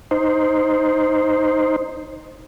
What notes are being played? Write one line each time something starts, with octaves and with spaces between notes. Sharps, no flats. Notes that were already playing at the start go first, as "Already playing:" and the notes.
D#4 C5